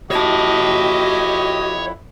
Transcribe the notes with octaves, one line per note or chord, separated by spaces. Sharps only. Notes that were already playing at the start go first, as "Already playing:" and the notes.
F2 E4 F#4 G4 C#5 D#5 A5